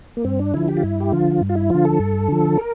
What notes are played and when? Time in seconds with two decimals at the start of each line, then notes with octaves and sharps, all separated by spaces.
0.17 A#3
0.24 G2 C4
0.39 D4
0.54 D3 F3 E4
0.68 G4
0.77 F4
0.83 G2 E4
1.00 G4
1.12 D3 F3 F4
1.41 G2
1.49 F4
1.55 E4
1.70 D3 F3 F4
1.85 A4
1.99 G2
2.28 D3 F3
2.57 A#4